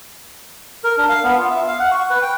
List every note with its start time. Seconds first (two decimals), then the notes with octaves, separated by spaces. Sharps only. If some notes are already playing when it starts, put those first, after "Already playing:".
0.84 A#4
0.97 D4
1.09 F5
1.24 B3
1.38 F4
1.51 E5
1.67 F5
1.80 F#5
1.91 C#6
2.10 B4
2.22 G5